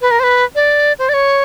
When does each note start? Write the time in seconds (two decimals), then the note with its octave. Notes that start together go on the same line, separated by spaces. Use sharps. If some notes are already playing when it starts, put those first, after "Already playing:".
0.02 B4
0.11 A#4
0.20 C5
0.23 B4
0.55 D5
0.99 C5
1.09 D5
1.14 C#5